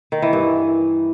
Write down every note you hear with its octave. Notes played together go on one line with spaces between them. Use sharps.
D#3
E3
G2